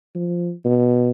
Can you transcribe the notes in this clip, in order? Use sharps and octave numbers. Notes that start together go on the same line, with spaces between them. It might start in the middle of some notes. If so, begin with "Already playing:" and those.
F3
B2